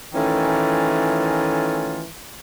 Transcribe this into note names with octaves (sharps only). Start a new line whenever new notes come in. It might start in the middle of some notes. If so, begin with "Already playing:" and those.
D#3 E3 A3 C#4 F4